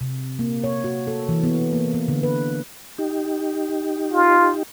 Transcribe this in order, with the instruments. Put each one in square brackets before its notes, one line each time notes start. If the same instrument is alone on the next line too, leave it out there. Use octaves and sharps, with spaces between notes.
[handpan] C3
A#3
C#5
F#4
A4
E3
B3
A#3
B3
D3
B4
[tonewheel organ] D#4 G4
[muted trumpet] F4